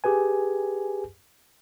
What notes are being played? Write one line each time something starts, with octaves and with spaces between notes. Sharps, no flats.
G4 G#4 B4 G#5